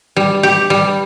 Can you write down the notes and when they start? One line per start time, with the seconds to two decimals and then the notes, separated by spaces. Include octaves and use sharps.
0.16 G3
0.43 G4
0.70 G3